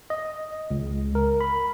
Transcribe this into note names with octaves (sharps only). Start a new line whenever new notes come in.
D#5
C#2
A#4
B5